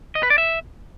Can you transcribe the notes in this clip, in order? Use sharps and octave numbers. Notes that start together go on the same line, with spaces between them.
D#5
B4
D5
E5